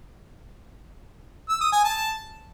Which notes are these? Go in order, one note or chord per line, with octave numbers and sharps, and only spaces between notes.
E6
D#6
G#5
A5